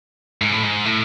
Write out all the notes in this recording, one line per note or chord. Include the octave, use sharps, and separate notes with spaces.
G#2
A2
G#2
A2